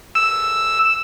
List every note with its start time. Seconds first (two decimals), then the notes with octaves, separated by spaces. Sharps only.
0.15 E6